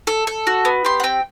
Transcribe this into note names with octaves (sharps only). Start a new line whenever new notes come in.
A4
A4
F#4
B3
G4 C6
F#5
C4 G5